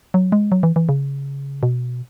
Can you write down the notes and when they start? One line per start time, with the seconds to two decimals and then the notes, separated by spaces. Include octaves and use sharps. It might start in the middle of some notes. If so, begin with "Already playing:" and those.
0.14 F#3
0.32 G#3
0.52 F#3
0.63 E3
0.76 E3
0.89 C#3
1.63 B2